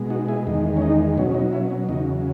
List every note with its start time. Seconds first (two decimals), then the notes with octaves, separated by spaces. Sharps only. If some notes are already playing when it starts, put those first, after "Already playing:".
Already playing: B2 G#3
0.10 D#4 F#4
0.28 E4 G#4
0.47 E2 D#3 G#3
0.77 C#4
0.82 D#4
1.18 B2 F#3 C#4
1.29 C#4
1.35 D#4
1.53 C#4 E4
1.70 C#4
1.89 E2 C#3 F#3 D#4